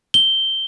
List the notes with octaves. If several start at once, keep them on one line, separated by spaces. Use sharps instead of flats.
G7